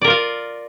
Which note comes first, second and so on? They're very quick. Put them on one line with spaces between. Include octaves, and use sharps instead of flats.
D5 A#4 F4 F5